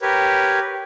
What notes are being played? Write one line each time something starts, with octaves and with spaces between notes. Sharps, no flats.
G4 A#4 B4 C#5